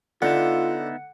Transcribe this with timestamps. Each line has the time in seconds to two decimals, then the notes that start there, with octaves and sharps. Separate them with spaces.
0.22 D3 B3 D#4 F4 E5 F#5